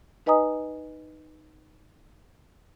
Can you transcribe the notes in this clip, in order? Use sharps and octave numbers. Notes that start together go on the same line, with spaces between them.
D#4 B4 D#5 G#5 A#5 D#6